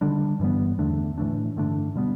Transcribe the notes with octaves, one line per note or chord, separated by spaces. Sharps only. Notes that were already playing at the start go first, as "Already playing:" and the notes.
D3 G3 D4
G2 E3 G3 B3
E2 D3 A3 D4
A2 E3 A3 D4
G2 D3 A3 D4
B2 G3 B3